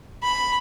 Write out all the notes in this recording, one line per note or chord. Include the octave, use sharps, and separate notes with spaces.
B5